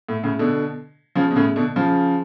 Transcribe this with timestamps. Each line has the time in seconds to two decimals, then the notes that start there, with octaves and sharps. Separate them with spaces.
0.09 A2
0.23 A2 C#3
0.39 B2 D3
1.15 C#3 F3
1.31 B2
1.36 A2 C#3
1.56 B2 D3
1.76 C#3 F3